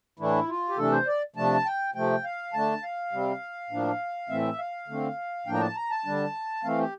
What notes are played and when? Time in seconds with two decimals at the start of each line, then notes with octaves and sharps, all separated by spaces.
0.19 A2 E3 A3 D4 E4
0.49 F4
0.69 G4
0.77 C3 E3 A3 D4 A4
0.92 C5
1.07 D5
1.36 C3 F3 A3 D4 A5
1.65 G5
1.94 C3 F3 A3 G5
2.24 F5
2.53 D3 A3 D4 A5
2.83 F5
3.12 C3 G3 C4
3.70 A2 F3 A#3 D4
4.29 A2 E3 A3 C4 E5
4.59 F5
4.88 D3 A3 C4
5.46 A2 F3 A#3 D4 G5
5.54 A#5
5.61 A5
5.76 A#5
5.90 A5
6.05 D3 G3 D4
6.64 E3 A3 C4 F5
6.78 G4